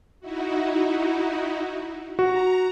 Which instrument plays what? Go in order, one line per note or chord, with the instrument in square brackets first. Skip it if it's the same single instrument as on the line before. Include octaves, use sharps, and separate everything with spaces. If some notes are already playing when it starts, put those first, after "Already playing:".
[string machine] D#4 E4 F#4
[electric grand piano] F#4 [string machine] A#5